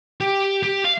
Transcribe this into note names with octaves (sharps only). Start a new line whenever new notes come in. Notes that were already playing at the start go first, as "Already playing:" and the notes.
G4
G4
F5